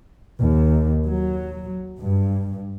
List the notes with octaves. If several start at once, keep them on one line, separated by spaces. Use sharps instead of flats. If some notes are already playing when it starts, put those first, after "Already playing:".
D#2
F#3
G2